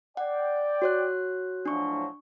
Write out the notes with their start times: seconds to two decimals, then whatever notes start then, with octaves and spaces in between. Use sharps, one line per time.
0.17 D5 F#5 G5
0.82 F#4 C#5 F#6
1.66 A2 F3 F#3 D4 C#6